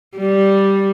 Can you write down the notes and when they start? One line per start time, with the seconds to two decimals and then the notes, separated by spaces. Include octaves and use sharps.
0.18 G3